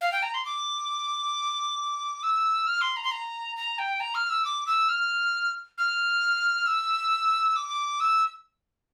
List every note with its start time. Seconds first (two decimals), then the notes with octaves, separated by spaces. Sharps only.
0.01 F5
0.12 G5
0.23 A#5
0.34 C6
0.45 D6
2.23 E6
2.67 F6
2.81 C6
2.96 A#5
3.04 C6
3.11 A#5
3.56 A#5
3.79 G5
4.00 A#5
4.15 F6
4.30 E6
4.45 D6
4.67 E6
4.89 F6
5.78 F6
6.66 E6
7.56 D6
8.00 E6